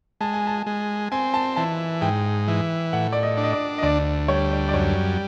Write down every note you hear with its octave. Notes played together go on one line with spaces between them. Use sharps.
G#3 A5
G#5
A5
G#3
C4 G#5
A5
E3 A5
G#2 G5
E3
A2 F#5
D5
D#5
D4
D#5
D5
D#5
D2 D5
G3 C#5
D5
D5
F#2 C#5